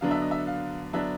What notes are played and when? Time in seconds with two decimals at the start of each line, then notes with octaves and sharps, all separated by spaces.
0.01 D3 F#3 B3 D4 F5
0.11 E5
0.22 D#5
0.31 E5
0.47 F5
0.93 D3 F#3 B3 D4 E5